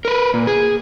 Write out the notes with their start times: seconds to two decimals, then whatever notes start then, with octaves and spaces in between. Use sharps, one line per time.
0.05 A#4 B4
0.34 A#2
0.47 G#4